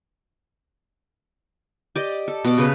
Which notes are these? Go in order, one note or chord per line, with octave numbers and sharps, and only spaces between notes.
G4 D5 D#5
A4
B2 D6
C#3 B4